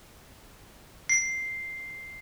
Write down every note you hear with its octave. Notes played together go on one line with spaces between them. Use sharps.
C7